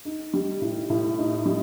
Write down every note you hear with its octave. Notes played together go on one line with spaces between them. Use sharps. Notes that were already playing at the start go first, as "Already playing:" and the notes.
D#4
G3
A2
A2
D#4
G3